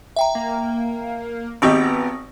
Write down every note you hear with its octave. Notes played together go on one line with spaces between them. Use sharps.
E5 G5 A#5
A#3
G#1 B3 C4 G4 D#5 C#6 D#6